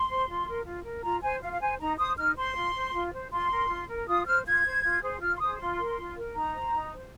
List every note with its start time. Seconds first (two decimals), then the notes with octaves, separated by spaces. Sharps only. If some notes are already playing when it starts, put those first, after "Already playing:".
Already playing: C6
0.09 C5
0.28 F4
0.47 A#4
0.65 F4
0.85 A#4
1.03 F4 A#5
1.22 C5 G#5
1.41 F4 F5
1.52 F5
1.60 C5 G#5
1.79 D#4 A#5
1.98 C5 D#6
2.17 D#4 F6
2.36 C5 C6
2.56 F4
2.74 C5
2.93 F4
3.13 C5
3.31 F4 C6
3.50 A#4
3.69 F4
3.88 A#4
4.07 F4 D#6
4.26 C5 F6
4.45 F4 G#6
4.64 C5
4.83 F4
5.02 G#4 C5
5.21 F4 F6
5.35 C6
5.39 G#4 C5 D#6
5.59 F4 C6
5.78 A#4
5.98 F4
6.16 A#4
6.35 D#4 A#5
6.54 C5
6.73 D#4
6.92 C5